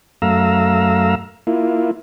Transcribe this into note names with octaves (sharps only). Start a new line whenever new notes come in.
F#2 A3 F5 A#5 E6
A#3 E4 F4